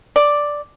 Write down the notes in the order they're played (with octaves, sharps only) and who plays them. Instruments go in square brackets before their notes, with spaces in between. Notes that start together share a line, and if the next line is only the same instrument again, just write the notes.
[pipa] D5